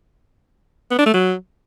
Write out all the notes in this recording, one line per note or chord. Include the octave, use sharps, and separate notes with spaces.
B3
D4
A3
F#3